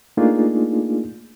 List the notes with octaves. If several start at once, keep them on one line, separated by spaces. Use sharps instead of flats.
A3 A#3 D4 D#4 F4 G#4